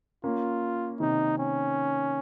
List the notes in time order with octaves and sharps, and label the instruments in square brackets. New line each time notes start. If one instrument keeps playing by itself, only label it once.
[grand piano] A#3 C#4 [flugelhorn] F4
[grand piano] C3 D#3 [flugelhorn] D#4
[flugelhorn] C#4